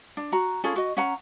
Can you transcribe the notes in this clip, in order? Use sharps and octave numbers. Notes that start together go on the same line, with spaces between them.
D4
F#4 A#5
C#4 F4 G#4 A4
F#4 D#5
C#4 F#5 A#5